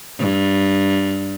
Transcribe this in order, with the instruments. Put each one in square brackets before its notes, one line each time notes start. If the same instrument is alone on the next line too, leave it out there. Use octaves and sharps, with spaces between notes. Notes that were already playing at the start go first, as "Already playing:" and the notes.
[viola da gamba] G2